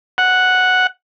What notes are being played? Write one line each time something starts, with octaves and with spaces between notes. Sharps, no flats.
F#5